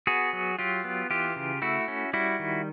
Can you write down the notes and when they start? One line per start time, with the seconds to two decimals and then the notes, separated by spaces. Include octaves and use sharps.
0.07 B3 F#4 G#4
0.33 F#3
0.59 F#3 F4 G4
0.84 B3
1.10 E3 F4 G4
1.36 C#3
1.62 A3 E4 F#4
1.88 C#4
2.13 G3 E4 F#4
2.39 D#3